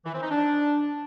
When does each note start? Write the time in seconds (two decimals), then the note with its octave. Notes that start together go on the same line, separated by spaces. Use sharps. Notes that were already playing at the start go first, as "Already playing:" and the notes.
0.06 E3
0.14 C4
0.22 D#4
0.30 D4